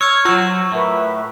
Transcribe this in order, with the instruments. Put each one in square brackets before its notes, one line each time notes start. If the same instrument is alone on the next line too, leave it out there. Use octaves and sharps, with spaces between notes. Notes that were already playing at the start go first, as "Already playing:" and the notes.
[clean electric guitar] C#5 [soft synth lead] C#6 [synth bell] E6 F6 G#6
[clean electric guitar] F#3 F#4 [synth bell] F4 E6 [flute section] C5
[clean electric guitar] A2 [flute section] A#4 B4 E5